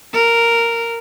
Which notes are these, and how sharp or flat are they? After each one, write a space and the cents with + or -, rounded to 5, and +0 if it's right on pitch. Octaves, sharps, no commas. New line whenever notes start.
A#4 -5